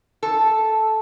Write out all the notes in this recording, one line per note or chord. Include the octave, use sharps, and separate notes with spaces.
A4